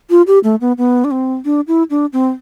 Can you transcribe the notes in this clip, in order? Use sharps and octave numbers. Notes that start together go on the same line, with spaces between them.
F4
G4
A3
B3
B3
D4
C4
D4
E4
D4
C4